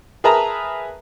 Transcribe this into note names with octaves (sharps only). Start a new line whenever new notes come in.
G#4 A#4 B4 E5 A5 A#5